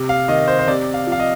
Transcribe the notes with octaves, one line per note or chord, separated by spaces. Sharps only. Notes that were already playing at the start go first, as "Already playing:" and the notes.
Already playing: C3
F5
D#3 D#5
C5
C5
C3 D5
F5
F3 F5
D#5